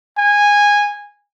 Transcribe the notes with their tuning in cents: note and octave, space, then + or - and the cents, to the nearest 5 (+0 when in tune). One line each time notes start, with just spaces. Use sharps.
G#5 -15